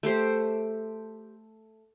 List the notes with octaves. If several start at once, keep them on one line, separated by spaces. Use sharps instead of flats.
A3 G4 C5